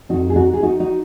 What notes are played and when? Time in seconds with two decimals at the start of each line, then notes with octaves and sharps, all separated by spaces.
0.09 F2 D#3 D#4 F#4
0.30 G#4
0.36 D#4 F#4
0.53 G#4
0.63 D#4 F#4
0.80 D#4 F#4